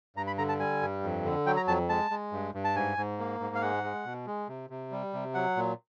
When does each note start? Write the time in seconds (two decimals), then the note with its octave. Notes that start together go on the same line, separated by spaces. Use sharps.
0.16 G2 A#5
0.27 B5
0.38 D3 A#5
0.49 A5
0.60 G3 G#5
0.82 G2
1.03 F2
1.24 D3
1.46 F#3 G5
1.57 A#5
1.68 F2 A5
1.89 G#3 A5
2.11 G#3
2.32 G2
2.54 G2
2.64 A5
2.76 G#2 G#5
2.97 G#2
3.19 A#3
3.40 G#2
3.55 F5
3.62 G#3 F#5
3.84 G#3
4.05 B2
4.27 G#3
4.48 C3
4.70 C3
4.92 G3
5.13 C3
5.34 F#3 F#5
5.57 A#2